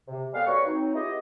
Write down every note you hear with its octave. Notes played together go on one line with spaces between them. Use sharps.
C3
G3 G#3 B3 A4 B4 F5
F#2 G3 F#4 B4 C#5 C#6
F#3 C4 D#4
B3 E4 F4 G4 G#4 D#5